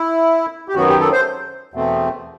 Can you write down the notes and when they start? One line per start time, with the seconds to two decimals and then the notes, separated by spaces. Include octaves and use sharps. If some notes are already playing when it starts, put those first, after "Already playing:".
Already playing: E4
0.69 G4
0.75 F#2 D#3 F#3 B3 F#4
0.88 G4
1.00 A4
1.12 C5
1.74 E2 B2 A3 C4